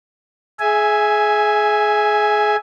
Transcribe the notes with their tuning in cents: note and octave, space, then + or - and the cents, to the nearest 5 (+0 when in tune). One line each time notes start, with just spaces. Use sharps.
G#4 +25 E5 +0 G#5 +0